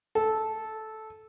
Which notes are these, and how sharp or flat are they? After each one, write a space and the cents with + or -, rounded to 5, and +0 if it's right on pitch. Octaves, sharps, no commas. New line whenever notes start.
A4 -10